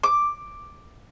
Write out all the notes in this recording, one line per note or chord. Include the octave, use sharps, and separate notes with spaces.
D6